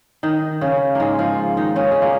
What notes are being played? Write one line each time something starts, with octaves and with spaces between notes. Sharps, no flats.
D#3 D#4
C#3 C#4
G#2 G#3 A#3
F3 F4
D#3 D#4
C#3 C#4
G#3
A#2 A#3